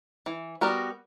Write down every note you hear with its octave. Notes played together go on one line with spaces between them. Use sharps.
E3
G3 B3 F#4 A#4